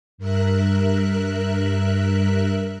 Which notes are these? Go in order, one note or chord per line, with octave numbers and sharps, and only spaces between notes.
G2 A#4 E5 F#6